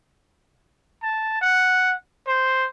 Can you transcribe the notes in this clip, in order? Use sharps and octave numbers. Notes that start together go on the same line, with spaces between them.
A5
F#5
C5